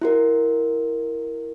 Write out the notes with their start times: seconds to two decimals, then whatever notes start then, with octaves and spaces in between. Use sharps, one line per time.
0.01 E4 F#4 A#4